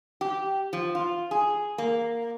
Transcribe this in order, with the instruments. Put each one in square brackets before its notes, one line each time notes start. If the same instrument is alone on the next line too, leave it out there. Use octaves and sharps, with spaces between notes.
[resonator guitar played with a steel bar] G4
F3
F4
G#4
A#3